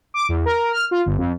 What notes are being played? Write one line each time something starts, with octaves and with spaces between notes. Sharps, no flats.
D6
E2
A#4
F6
F4
G1
F2